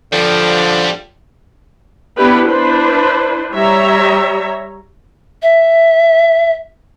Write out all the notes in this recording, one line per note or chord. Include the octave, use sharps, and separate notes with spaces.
D3 F3 G3 D4
B3 D4 E4 G4 B4
D4 E4 B4 C5
G3 C#5 E5 A#5
E5